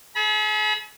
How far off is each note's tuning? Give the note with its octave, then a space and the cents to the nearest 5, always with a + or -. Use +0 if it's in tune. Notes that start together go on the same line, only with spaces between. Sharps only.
G#4 +45 B5 -30